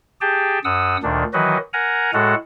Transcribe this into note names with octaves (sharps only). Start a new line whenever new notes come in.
G4 G#4 G5 A5
F#2 F#5 D#6 E6
D2 A#2 D#3 D4
D#3 E3 F#3 F#4 B4 D#5
A#4 F#5 G#5 A#5
A2 G#3 F#4 A4 F#5